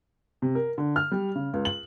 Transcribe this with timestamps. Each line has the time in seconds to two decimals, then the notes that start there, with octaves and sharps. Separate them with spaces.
0.42 C3
0.55 A#4
0.78 D3
0.96 F6
1.12 G3
1.35 C#3
1.53 C#2
1.65 F#7